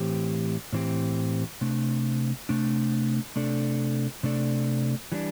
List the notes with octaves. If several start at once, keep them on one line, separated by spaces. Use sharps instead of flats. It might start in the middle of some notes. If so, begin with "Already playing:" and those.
Already playing: A2 E3 C4 G4
A2 E3 C4 G4
C3 A3 D4
C3 A3 D4
C3 A3 D4 A4 D5
C3 A3 D4 A4 D5
E3 G3 D4